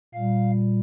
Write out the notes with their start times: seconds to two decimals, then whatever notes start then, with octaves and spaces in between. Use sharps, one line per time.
0.14 A#2 G3 F5